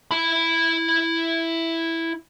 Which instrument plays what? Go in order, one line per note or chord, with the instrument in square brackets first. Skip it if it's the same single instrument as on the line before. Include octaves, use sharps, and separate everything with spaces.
[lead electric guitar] E4 B5